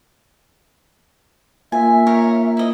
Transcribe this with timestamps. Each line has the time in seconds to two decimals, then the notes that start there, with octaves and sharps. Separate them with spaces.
1.72 A#3 F4 E5 G#5
2.06 D#4 A#4 C#5
2.57 E4 D#5